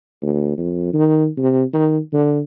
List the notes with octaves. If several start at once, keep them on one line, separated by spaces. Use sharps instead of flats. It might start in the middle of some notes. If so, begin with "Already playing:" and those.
D2
F2
D#3
C3
D#3
D3